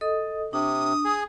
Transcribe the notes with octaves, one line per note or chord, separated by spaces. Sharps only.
A4 D#5 D#6
C3 D4 D#6
G#4